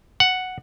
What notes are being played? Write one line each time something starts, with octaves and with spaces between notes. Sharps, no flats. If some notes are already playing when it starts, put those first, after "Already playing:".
F#5